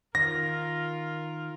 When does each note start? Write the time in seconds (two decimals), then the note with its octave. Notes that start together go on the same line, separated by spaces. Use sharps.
0.15 D#3 F4 A#4 A#6